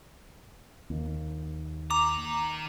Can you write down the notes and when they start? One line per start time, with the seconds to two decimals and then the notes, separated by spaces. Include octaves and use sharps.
0.90 D#2
1.91 D#3 A#5 D6